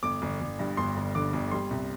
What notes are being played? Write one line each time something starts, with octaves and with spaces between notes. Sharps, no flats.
G1 D6
G1
G1
G2
G1 C6
G1
D3 D6
G1
G3 C6
C2